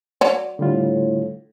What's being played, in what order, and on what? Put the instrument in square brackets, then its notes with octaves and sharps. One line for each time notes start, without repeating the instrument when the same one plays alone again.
[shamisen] F#3 C#5 D5
[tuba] A2 [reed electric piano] D3 G3 F4